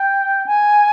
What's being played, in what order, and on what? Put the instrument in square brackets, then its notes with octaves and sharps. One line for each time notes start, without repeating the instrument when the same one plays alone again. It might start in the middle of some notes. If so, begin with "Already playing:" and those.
Already playing: [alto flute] G5
G#5